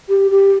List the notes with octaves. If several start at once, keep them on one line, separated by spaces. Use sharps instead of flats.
G4
G4